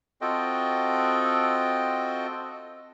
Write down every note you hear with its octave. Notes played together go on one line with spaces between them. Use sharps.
C4 F4 F#4 A4 D#5 G5